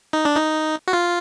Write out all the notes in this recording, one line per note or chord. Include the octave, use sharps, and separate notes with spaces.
D#4
D4
D#4
F#4
F4